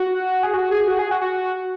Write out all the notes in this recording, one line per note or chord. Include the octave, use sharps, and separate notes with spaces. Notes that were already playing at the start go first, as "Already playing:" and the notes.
Already playing: F#4
G#4
F#4
G#4
F#4
G#4
F#4
F#4